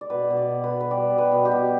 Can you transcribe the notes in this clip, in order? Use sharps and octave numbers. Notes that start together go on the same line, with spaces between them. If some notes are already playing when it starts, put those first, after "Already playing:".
D5
B2 B4
B2
D5
B2
B4
B2
B4
G3 D5
B2
B4
B2
G4
B2